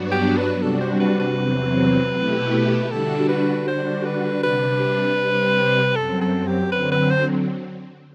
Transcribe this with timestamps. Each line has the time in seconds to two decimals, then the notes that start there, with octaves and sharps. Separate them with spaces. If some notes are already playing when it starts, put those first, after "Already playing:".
Already playing: G2 F#3 B3 D4 F#4
0.12 G4
0.37 B4
0.61 C3 G3 D4 F#4 A4
0.81 C5
1.00 B4
1.20 B4
1.38 E2 C3 F#3 C4
2.14 B2 A3 E4 G4
2.90 D3 G3 D4 F#4 A4
3.29 B4
3.67 D3 G3 D4 F#4 C5
4.05 B4
4.43 C3 G3 D4 B4
5.19 C3 G3 C4
5.96 F#2 F#3 C4 A4
6.21 A4
6.47 G4
6.72 D3 F#3 C4 B4
6.92 B4
7.10 C5